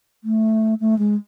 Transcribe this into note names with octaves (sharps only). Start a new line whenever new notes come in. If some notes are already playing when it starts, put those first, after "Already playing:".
A3
A3
G#3